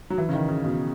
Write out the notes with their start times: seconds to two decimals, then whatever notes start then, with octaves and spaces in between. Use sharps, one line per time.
0.10 F#3
0.18 E3
0.29 C#3
0.33 D#3
0.48 C#3
0.64 B2